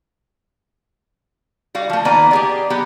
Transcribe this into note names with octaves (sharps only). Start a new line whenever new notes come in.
G3 F#4 F5
F3 A3
D#3 A#3 B3 D5 G#5 A#5
G4 G#4 D5
F#3 B3 G4